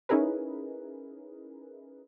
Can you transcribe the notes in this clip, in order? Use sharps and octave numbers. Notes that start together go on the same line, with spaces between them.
C#4 D#4 E4 G#4 A#4 B4